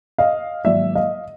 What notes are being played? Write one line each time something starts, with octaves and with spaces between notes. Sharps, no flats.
D#5 F5
G#2 D#3 F#3 A#3 D5 E5
D#5 F5